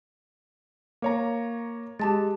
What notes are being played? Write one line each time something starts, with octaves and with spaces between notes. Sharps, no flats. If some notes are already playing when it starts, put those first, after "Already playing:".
A#3 C#5 A#5
G#3 G4 A5 A6